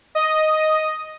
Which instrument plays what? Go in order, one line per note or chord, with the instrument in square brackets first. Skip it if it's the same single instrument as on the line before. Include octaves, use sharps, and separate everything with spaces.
[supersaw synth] D#5